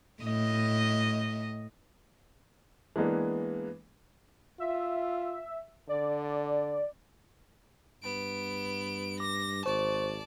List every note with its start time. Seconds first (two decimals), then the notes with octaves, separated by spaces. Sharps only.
0.23 A2 D#5
2.96 E3 G#3 A#3 B3 D4
4.60 F4 E5
5.89 D3 D5
8.03 G2 B3 D7
9.20 D6 A#6
9.66 G#1 C5 D5 A5 C#6